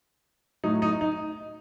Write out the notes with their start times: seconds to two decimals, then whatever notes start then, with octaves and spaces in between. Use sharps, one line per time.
0.64 A2 F#3 D#4
0.82 D#4
1.01 D#4